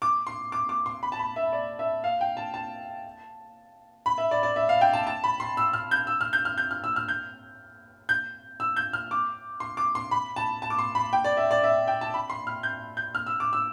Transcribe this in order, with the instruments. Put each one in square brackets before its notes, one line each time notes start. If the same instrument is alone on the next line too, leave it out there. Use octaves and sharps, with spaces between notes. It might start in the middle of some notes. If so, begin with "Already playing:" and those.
[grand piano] D6
C6
D6
D6
C6
B5
A5
B5
E5
D5
E5
F5
G5
A5
A5
B5
E5
D5
D5
E5
F5
G5
A5
A5
B5
C6
E6
F6
G6
E6
F6
G6
F6
G6
F6
E6
F6
G6
G6
E6
G6
F6
D6
C6
D6
C6
B5
A5
A5
D6
C6
B5
G5
D5
E5
D5
E5
G5
A5
B5
C6
F6
G6
G6
F6
E6
D6
E6